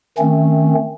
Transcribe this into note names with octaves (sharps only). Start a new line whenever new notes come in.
D#3 A3 C4 C#4